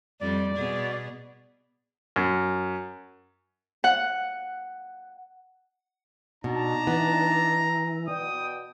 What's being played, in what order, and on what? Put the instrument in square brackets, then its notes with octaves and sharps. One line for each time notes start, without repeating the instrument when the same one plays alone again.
[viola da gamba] F2 G3 [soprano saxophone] D5
[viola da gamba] B2 G#4
[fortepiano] F#2
[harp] F#5
[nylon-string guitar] B2 [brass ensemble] D4 D#4 A5 [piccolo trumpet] A#5
[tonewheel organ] E3 [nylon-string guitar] B3
[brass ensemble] B2 D5 G5 [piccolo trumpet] D#6